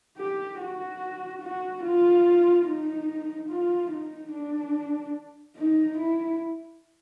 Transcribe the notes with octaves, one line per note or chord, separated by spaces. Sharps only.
G4
F#4
F#4
F4
D#4
F4
D#4
D4
D#4
E4